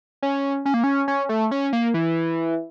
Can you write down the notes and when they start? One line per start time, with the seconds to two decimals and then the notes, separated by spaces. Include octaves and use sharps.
0.22 C#4
0.65 C#4
0.74 A#3
0.84 C#4
1.08 C#4
1.29 A3
1.51 C#4
1.73 A#3
1.94 E3